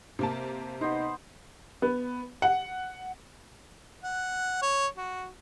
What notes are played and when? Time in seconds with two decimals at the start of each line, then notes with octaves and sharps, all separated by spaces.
0.19 C3 A#3 A5
0.81 B3 D#4 C5
1.82 B3
2.42 F#5
4.04 F#5
4.62 C#5
4.97 F#4